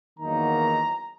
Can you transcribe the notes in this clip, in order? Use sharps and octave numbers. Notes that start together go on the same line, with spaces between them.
E2 D#3 F#3 A#3 D#4 A#5